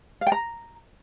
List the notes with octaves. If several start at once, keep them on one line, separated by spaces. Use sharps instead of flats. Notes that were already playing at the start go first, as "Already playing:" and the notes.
F5
G5
A#5